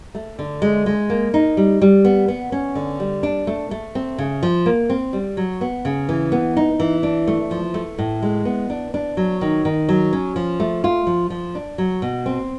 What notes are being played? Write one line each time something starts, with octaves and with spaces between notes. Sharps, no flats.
A3
D3
G#3
G#3
A#3
D#4
G3
G3
B3
B3
C#4
D3
G3
D4
A3
A3
C4
C#3
F3
A#3
C4
G3
F#3
B3
C#3
E3
B3
D#4
E3
D4
A3
F3
A3
A2
G#3
B3
D4
D4
F#3
D#3
D#3
F#3
C#4
F3
A3
F4
F3
F3
D4
F#3
B2
C4